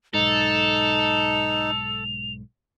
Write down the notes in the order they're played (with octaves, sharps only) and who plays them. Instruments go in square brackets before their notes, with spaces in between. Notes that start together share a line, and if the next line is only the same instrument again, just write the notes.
[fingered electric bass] B1 G#2 [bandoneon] D#4 [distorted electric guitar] A4 [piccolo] F7